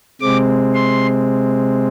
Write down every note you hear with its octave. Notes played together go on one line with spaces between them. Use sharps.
C3 G#3 C4 D6
C6